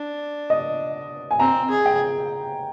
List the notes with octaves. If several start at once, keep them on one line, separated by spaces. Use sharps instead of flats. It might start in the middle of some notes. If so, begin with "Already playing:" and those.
Already playing: D4
D#5
G#5
C4 A#5
G#4
G5